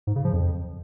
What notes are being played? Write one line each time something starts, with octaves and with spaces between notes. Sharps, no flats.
G#2
C#3
F3
F2